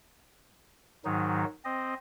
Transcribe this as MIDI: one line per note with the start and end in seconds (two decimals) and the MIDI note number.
1.05 1.45 44
1.05 1.45 51
1.05 1.45 54
1.05 1.45 63
1.65 1.94 60
1.65 1.94 75